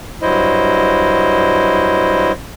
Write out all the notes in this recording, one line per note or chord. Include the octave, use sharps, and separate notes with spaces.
G2 F#3 E4 C5 D#5